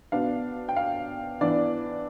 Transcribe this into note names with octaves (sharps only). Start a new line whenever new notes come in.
B2 B3 D4 F5
G5
F5
E3 B3 D4 D5